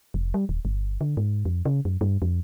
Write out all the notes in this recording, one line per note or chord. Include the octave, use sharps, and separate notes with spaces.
F1
G3
D#1
G1
D3
G#2
F2
C#3
F#2
G2
F2